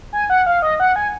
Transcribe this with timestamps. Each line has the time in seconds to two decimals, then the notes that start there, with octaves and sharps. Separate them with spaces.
0.13 G#5
0.30 F#5
0.46 F5
0.62 D#5
0.80 F#5
0.96 G#5